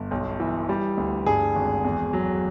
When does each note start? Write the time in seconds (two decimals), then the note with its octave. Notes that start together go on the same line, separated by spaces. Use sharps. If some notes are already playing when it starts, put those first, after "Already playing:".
Already playing: G1
0.11 B1
0.40 E3
0.69 G3
0.98 D2
1.26 G2 G#4
1.55 G#1
1.85 E2
2.13 F#3